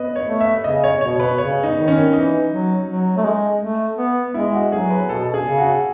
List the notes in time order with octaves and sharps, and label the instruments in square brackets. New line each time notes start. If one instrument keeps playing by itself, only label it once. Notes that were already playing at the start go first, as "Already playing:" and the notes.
Already playing: [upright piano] B3 B4 D#5
C#5
[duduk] A3
[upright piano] E5
[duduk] C#3 [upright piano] D#5
[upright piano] C#5
[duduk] B2 [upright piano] C#5
[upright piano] B4
[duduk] C#3 [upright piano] C#5
[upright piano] D#4
[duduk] D#3
[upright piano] C#4
[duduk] E3 [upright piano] D#4
[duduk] F#3
F#3
A3
G#3
A3
B3
[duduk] G#3 [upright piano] E4
[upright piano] F#4
[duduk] F#3 [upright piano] G#4
[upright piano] B4
[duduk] B2 [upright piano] A4
[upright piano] G#4
[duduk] C#3
[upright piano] F#4